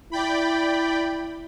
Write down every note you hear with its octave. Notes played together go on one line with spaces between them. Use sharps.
E4 D5 G5 B5